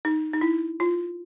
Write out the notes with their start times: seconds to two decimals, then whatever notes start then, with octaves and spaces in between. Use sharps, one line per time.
0.05 D#4
0.33 D#4
0.41 E4
0.80 F4